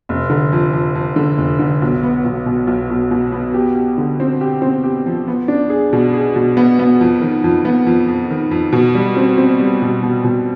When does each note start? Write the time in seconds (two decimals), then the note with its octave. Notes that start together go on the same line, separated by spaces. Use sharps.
0.09 F1
0.30 D3
0.52 F2
0.73 F2
0.95 F2
1.16 D3
1.38 F1
1.59 D3
1.82 B1
2.03 B3
2.25 B1
2.46 B2
2.67 B1
2.90 B1
3.11 B2
3.32 B3
3.54 G4
3.76 G4
3.98 D3
4.20 C4
4.41 G4
4.62 C4
4.84 G4
5.06 F3
5.28 B3
5.48 D4
5.70 G#4
5.93 B2
6.14 G#4
6.36 B2
6.57 B3
6.79 B3
7.01 F2
7.21 D#3
7.44 F2
7.65 B3
7.86 F2
8.08 F2
8.30 D#3
8.51 F2
8.72 B2
8.95 G3
9.17 C4
9.38 C4
9.59 G3
9.82 B2
10.03 B2
10.24 B2